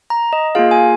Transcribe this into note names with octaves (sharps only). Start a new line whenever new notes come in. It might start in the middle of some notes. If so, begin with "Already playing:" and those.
A#5
D#5
A#3 F4 G#4 F5
G#5